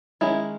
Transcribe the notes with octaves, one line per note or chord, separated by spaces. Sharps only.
D#3 G#3 C#4 E4